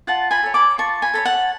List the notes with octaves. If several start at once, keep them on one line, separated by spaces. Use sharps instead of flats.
F4 F#5 A5
G#5 B5
A4 C#5
B5 D6
F4 A5 C#6
G#5 B5
A4 C#5 B5
F#5 A5